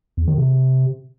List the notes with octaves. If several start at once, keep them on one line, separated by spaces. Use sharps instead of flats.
E2
D#3
C3